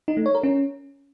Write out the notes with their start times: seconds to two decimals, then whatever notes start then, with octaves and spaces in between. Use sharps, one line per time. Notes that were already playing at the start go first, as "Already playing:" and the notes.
0.08 D#4
0.17 A3
0.26 C#5
0.35 A#4
0.43 C#4